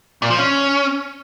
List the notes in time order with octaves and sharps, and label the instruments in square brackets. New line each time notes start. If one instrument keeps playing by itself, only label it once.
[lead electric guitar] A#2
F3
C#4